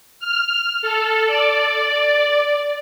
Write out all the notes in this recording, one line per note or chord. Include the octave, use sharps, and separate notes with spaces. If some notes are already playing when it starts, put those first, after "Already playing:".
F6
A4
D5